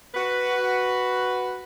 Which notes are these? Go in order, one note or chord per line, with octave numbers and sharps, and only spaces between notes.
F#4 B4